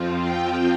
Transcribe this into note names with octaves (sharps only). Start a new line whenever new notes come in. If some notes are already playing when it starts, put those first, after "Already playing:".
Already playing: F2 F3 C4 F4
G5